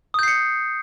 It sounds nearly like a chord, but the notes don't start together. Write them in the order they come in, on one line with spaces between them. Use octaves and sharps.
D#6 G6 C7 C#7